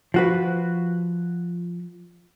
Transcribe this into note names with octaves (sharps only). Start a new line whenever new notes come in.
F3 F#4 B4